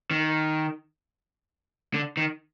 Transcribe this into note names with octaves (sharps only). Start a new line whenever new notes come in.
D#3
D3
D#3